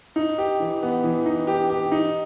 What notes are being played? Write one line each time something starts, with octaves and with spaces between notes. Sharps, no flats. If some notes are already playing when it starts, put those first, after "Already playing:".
D#4
G4
E3
B3
E3
D#4
G4
G4
D#4